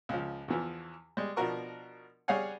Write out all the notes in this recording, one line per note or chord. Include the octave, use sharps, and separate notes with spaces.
C#2 F3
E2 E3 F3
G3 G#3
B2 F3 D4 F#4 A#4 C#6
G3 G#4 C#5 F5 F#5 G#5